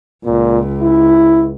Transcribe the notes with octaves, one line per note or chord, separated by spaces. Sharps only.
C#2 A#2
E4